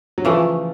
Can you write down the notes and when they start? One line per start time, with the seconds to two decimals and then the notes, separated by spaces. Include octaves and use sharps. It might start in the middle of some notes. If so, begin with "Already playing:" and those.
0.18 F#3
0.24 C#3 E3 F3 A3